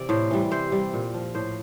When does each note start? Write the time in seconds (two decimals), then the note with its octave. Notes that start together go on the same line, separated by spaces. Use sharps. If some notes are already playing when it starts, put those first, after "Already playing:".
Already playing: C3 E3 D5
0.09 A2 C5
0.31 E3 G3
0.51 C3 C5
0.72 G3
0.93 A#2
1.14 F3
1.35 A2 C5